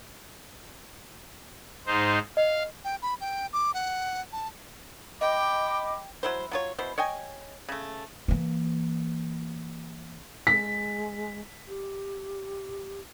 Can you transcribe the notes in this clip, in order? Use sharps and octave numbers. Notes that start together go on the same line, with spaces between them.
G#2 D#4 C5
D#5 F5
G5
B5
G5
D6
F#5
A5
D#5 G5 B5 D6
F#3 E4 C5
F#3 F4 C#5
B2 E4 C5
C#5 D#5 G5 G#5
C#3 A3
E3 A#3
G#3 B6
G4